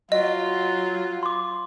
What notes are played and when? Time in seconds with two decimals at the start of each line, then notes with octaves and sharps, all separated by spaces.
0.12 F#3 F4 D#5
1.23 C6 D6